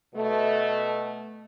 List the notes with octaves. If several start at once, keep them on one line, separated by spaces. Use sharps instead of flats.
B2 A3